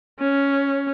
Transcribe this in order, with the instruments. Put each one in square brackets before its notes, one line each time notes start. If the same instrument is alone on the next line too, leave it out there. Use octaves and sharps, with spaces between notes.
[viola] C#4